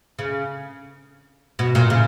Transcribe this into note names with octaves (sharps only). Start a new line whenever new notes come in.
C#3
B2
A#2
C#3